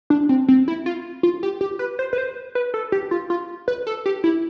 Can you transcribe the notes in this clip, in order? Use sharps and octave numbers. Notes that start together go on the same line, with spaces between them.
D4
C4
C4
E4
F4
F4
G4
G4
B4
C5
B4
C5
B4
A4
G4
F4
F4
B4
A4
G4
E4